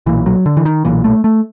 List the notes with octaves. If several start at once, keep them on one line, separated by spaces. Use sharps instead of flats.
B1 A#2 E3
F#3
D3
E3
D#3
B1 A#2 E3
A3
A3